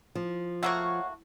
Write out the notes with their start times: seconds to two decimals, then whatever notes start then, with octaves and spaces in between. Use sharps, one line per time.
0.15 F3
0.63 A3 A#3 F#4 C#5 F5 F#5